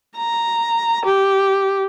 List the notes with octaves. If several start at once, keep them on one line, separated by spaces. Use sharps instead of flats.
A#5
G4